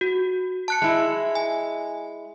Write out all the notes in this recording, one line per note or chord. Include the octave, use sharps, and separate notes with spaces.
F#4
A5 F#6 C#7
G#3 E4
G#5